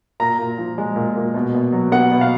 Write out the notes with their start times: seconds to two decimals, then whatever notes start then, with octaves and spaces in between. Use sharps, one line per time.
0.20 A#2 A#5
0.38 A#2
0.58 F3
0.78 G#3
0.96 A#2
1.16 A#2
1.34 B2
1.54 B2
1.72 F#3
1.92 B3 F#5
2.11 B2
2.21 F5